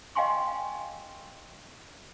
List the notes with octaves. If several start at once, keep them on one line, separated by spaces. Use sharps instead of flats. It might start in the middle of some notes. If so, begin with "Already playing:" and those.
D#5 F5 G5 G#5 C6 C#6